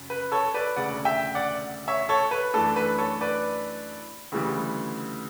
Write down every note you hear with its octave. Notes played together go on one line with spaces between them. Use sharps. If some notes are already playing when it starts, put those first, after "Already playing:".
Already playing: F#2 C#3
B4
A4 C#5
B4 D5
E1 D2 C#3 D5 F#5
E5 G5
D5 F#5
C#5 E5
A4 C#5
B4
F#2 E3 A3 D4 A4
B4
A4 C#5
B4 D5
D2 C#3 E3 G3